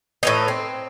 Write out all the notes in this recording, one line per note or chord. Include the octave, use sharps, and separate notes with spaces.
A2 E3 D#4
C4